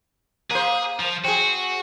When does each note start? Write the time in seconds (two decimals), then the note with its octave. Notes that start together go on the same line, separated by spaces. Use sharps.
0.51 A#3 G#4 C5
0.99 F3
1.24 C4 F#4 G#4